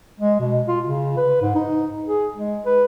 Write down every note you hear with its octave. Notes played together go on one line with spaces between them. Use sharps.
G#3
B2
F4
C#3
B4
G#2
D#4
G#4
G#3
B4